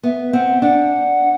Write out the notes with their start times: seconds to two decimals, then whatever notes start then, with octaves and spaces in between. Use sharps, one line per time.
0.03 B3 E5
0.33 C4 F#5
0.62 D4 F#5